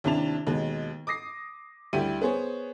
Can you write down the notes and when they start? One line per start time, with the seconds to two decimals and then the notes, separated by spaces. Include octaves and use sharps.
0.04 D#2 C3 D4 E4 A5 F7
0.47 D#2 B2 G#3
1.07 D6 D#6 A#6 C7
1.93 D2 G3 E4 G4 D#7
2.22 B3 G#4 C5 C#5